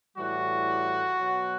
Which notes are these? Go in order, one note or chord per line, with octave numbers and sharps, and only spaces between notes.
A2 E3 G3 F#4
B2 F#3